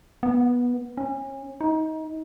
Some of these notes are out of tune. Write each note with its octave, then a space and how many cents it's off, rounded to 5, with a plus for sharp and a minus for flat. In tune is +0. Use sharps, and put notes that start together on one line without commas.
B3 -15
C#4 -30
D#4 +25